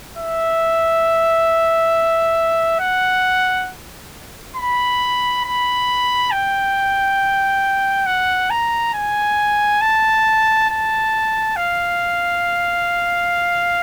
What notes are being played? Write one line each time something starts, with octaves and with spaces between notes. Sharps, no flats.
E5
F#5
B5
B5
G5
F#5
A#5
G#5
A5
A5
F5